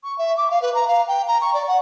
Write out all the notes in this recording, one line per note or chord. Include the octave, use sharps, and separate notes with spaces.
C#6
E5
D6
F5
B4
A#5
F5
G5
A#5
C#6
D5
F#5